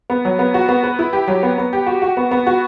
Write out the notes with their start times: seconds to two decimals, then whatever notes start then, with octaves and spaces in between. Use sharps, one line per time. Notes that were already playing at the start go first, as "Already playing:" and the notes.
0.10 B3
0.25 F#3
0.39 B3
0.54 F#4
0.69 B3
0.83 B4
0.99 E4
1.13 G4
1.28 F#3
1.43 B3
1.58 B3
1.73 G4
1.86 F#4
2.02 F#4
2.17 B3
2.31 B3
2.47 F#4